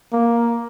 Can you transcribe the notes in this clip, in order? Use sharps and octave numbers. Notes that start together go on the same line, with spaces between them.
A#3